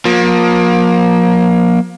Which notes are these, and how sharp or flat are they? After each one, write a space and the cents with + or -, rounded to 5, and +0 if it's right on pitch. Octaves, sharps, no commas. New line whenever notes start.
F3 +40 A#3 +25